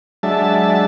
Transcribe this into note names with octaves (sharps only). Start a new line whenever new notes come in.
F#3 G#3 D4 E5 A5